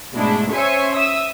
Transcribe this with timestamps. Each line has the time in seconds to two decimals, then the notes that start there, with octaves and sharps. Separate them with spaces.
0.14 G#2 B2 G#3 A3 D4 E4
0.53 C#4 C5 C#5 E5 G#5 C#6
0.95 E5 D#6 E6